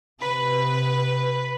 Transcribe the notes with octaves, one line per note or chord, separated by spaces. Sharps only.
C3 B4 B5